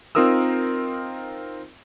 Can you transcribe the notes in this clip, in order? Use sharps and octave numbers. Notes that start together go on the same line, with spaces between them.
C4 D#4 F4 A#4 D#6 E6